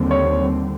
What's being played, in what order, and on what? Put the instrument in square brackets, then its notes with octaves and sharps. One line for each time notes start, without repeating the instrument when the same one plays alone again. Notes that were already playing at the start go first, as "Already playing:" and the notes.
Already playing: [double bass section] D#2 D3 G3 C4
[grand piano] C#5